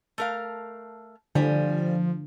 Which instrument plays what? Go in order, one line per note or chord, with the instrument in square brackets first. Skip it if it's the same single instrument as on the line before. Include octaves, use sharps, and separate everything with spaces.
[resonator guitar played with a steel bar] A3 A#4 F5
[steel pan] D3 [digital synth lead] F3 [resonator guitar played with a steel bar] G3 G#5